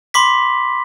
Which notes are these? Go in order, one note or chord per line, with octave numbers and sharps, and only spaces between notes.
B5 C6 D6 B6